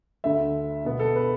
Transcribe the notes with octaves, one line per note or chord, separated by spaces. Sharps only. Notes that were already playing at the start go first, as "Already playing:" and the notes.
D2 D3 A3 E5
B2 B3
A4
B4